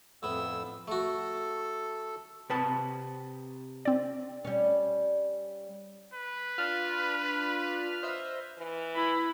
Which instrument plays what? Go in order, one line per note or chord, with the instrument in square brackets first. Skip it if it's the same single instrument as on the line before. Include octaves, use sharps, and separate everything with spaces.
[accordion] F2 E6 [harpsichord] A2 B3
[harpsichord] A3 F#4 [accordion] A4
[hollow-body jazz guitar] C3 B4 A5
[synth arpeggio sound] C4 D5
[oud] G3 C#4
[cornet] B4
[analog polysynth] D4 F4 [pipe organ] F6
[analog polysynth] C5 D#5 E5
[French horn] E3
[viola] E4 B5